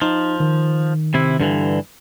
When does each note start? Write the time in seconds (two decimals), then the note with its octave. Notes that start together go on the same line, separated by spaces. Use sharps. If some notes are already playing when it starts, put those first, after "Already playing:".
0.01 F3 D#4
0.40 D#3
1.14 C3 E4
1.40 G2 D3 E3